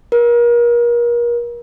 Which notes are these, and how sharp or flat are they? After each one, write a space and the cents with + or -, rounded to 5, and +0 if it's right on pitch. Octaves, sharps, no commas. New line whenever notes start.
A#4 +35